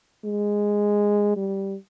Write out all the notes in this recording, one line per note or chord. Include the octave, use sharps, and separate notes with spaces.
G#3
G3